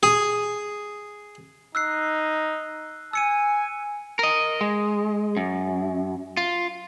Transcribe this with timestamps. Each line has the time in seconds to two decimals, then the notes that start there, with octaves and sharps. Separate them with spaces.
0.03 G#4
1.75 D#4 E6 F#6 C7
3.13 G#5 E6 C#7 D#7
4.19 A#4 D#5
4.61 G#3
5.37 F#2
6.37 F4